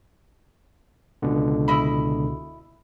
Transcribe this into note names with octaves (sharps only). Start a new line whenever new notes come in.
C#2 B2 D3
E4 D#5 B5